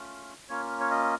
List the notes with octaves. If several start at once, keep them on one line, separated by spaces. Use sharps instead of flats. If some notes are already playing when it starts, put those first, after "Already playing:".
Already playing: A3 C#4 F4
A#3 C#4 F4 C#5
C#5
D#5